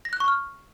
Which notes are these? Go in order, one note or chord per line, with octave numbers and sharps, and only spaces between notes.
A#6
F#6
C#6
F6